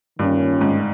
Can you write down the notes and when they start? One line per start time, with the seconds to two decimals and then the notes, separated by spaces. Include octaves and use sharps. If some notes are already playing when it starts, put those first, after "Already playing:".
0.19 G2 D#3 A#3 C#4 F4
0.61 G#2